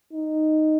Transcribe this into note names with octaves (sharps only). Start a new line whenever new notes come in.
D#4